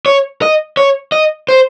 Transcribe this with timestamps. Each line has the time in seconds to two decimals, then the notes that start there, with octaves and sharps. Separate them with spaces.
0.06 C#5
0.42 D#5
0.77 C#5
1.12 D#5
1.49 C5